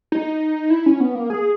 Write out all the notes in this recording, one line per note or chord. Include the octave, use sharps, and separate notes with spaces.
D#4
E4
C#4
B3
A#3
G#4